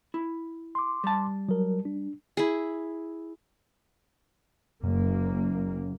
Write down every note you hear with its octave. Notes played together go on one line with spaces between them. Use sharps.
E4
C6 D6
G3 A5
F#3 A#4
D4
E4 G#4
F#1 F#2 A#3